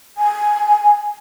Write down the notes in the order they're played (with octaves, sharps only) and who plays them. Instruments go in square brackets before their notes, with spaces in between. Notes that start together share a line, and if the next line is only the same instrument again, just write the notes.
[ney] G#5